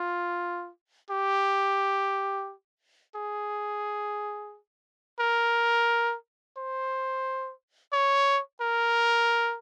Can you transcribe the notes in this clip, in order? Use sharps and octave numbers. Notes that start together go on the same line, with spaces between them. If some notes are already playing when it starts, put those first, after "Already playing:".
Already playing: F4
G4
G#4
A#4
C5
C#5
A#4